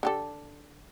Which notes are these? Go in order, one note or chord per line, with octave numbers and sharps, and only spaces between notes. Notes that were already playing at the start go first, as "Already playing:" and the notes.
D3 G4 A4